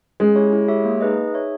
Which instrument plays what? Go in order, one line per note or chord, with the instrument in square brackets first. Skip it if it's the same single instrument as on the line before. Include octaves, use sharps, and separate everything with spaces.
[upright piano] G#3 [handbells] C#4
[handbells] E4 G4 C#5
E4
G4 C#5 E5
A#3
D#4 G#4 B4 D#5
D#4
G#4 C#5 E5